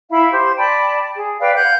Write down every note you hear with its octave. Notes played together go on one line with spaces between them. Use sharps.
E4 E5 F5 B5
G4 C5
D5 G5 A5 B5
G#4
B4 D5 F5 G5
F5 F#5 F#6 G6